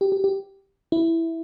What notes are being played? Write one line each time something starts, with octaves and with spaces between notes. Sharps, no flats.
G4
G4
G4
E4